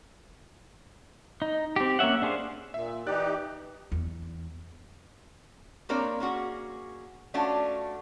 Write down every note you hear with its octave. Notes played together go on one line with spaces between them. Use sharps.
D#4
C4 G4
A#3 C#4 C#5 E5 F#5
D4 G#4 C5 F5
A#2 E5
E3 D#4 G4 D5 F#6
E2
A#3 C4 D4 A#4 C#5 D5
A#3 C#4 F#4 G#4
A3 C#4 D4 F4 F#4